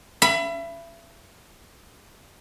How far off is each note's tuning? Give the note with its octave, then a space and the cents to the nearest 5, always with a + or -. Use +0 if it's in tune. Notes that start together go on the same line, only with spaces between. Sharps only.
E5 +35 B5 +0